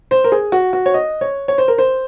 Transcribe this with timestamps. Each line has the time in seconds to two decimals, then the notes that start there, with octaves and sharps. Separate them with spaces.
0.11 C5
0.24 A#4
0.32 G#4
0.52 F#4
0.73 F#4
0.86 C#5
0.94 D#5
1.21 C#5
1.48 C#5
1.58 C5
1.68 A#4
1.78 C5